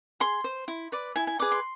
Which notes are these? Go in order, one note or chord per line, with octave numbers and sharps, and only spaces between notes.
G#4 C6
C5
E4
B4 D5
E4 G#5
G#5
G#4 B4 D5 D6
C6